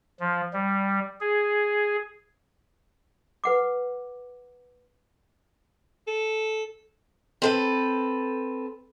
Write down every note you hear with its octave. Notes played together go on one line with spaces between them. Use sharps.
F3
G3
G#4
B4 F#5 D6
A4
C4 A4 B4